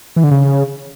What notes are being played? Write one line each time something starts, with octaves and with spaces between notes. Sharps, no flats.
E3
D3
C#3